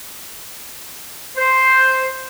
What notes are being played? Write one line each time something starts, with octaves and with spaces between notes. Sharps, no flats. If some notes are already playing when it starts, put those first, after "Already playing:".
C5